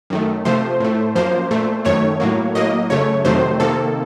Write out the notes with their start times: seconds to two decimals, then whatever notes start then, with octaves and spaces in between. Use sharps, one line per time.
0.10 F#2 D#3 A3
0.45 C3 F3 A3 C5
0.80 A2 A3
1.15 F#2 F3 A#3 C5
1.51 A#2 A3
1.85 F#2 D#3 A3 C#5
2.20 A2 F#3 A#3
2.55 A2 F#3 A#3 D#5
2.90 F#2 C#3 A3 C#5
3.25 F2 C3 D#3 F#3 A3 C5
3.60 C3 D#3 A#3 A4